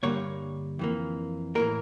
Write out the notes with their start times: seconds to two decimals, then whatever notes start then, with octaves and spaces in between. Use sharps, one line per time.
0.03 G2 D3 G3 A#3 C#5
0.79 F2 E3 A#3
1.55 A2 E3 A#3 A#4